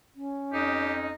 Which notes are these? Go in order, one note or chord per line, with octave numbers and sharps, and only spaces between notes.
C#4
F2 D#4 G4